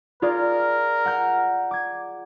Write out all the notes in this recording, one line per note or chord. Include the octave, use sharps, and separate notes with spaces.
F4 G#4 A#4 D5
F#5 A#5 G6
D6 G#6